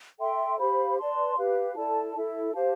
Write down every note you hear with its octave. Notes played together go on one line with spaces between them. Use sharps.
A4 E5 G5 C6
G4 C5 F5 B5
B4 D5 A5 C6
G4 B4 F5
E4 A4 D5 A5
E4 A4 E5
G4 C5 F5 A5